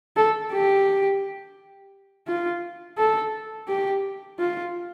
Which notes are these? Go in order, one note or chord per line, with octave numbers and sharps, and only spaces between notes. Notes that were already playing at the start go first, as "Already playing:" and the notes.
A4
G4
F4
A4
G4
F4